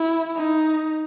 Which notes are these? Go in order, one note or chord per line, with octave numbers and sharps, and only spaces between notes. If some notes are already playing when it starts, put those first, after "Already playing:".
Already playing: E4
D#4